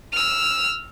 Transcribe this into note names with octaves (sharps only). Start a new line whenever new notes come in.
E6 F6